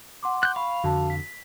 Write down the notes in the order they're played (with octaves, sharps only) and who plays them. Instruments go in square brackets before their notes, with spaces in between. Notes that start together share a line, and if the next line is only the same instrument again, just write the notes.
[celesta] F#5 C6 D6
[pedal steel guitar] F#6 G6
[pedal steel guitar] F5 [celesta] B5 C#6
[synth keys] F2 D3 [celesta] F#4 A5
[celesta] B6